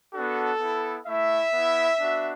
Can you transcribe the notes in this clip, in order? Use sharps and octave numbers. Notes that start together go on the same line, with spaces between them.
B3 D4 F#4 A4
B3 E4
A3 E4 E5
B3 E4
B3 D4 F#4